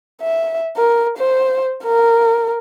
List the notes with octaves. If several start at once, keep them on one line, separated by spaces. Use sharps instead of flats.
E5
A#4
C5
A#4